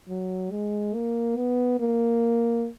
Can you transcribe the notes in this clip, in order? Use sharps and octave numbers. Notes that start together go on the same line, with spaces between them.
F#3
G#3
A#3
B3
A#3